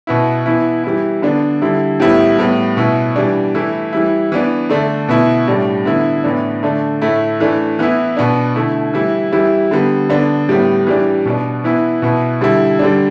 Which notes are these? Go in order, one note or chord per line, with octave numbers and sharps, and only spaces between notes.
B2 B3 E4
E3 B3 E4
E3 G3 E4
D3 B3 D4
D3 G3 E4
A2 G3 B3 E4
A2 G3 B3
B2 B3 E4
E3 G3 D4
E3 A3 E4
E3 G3 E4
E3 B3 D4
D3 A3 D4
B2 B3 E4
A2 G3 D4
D3 B3 E4
A2 E3 B3 D4
D3 A3 D4
A2 A3 E4
E3 A3 D4
E3 B3 E4
B2 B3 D4
D3 A3 E4
E3 G3 E4
E3 G3 E4
D3 G3 B3
D3 B3 D4
A2 G3 B3
E3 G3 D4
B2 B3 D4
E3 B3 E4
B2 B3 E4
D3 G3 E4
D3 G3 D4